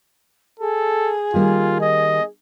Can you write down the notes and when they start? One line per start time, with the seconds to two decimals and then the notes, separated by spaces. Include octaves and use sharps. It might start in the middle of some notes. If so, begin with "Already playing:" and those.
0.60 G#4 A4
1.34 D#3 G3 A#3 F4
1.81 D#5